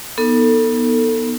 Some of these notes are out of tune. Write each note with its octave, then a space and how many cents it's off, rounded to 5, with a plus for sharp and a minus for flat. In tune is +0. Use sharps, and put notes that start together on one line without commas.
B3 -25 D#4 +0 A4 +25